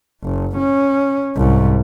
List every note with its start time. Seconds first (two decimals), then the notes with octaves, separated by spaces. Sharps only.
0.24 F#1
0.58 C#4
1.36 C2 G#2